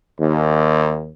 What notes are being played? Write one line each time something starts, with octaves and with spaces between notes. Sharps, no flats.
D#2